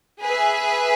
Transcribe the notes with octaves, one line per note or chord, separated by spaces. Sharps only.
G#4 B4 E5